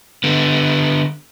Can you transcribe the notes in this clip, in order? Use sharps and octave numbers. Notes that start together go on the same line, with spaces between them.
D3 B3